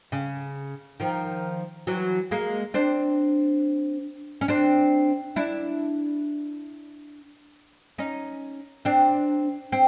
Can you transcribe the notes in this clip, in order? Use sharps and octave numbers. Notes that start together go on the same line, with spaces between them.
C#3
D#3 F3
E3 F#3
G#3 A#3
C4 D4
C#4
C4 D4
D4 E4
C#4 D#4
C4 D4
C4